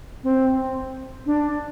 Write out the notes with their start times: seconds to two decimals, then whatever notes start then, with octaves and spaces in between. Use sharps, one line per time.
0.24 C4
1.26 D4